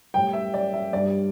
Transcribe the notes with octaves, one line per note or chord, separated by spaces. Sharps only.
A2 G3 G5
E5
D5
E5
G2 G3 D5